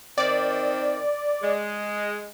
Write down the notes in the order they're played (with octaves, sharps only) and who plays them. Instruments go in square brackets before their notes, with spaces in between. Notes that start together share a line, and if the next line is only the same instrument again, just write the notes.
[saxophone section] D#3 C4 [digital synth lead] D5
[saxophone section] G#3